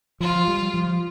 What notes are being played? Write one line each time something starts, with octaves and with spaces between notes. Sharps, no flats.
F3 F4
G3
F3